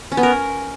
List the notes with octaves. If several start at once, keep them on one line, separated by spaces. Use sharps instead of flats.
C#4
B3
A#4